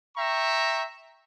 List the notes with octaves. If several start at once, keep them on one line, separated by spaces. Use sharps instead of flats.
E5 G5 A#5 C#6